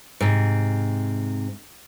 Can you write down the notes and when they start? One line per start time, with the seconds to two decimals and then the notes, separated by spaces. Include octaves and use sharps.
0.21 G#2 C3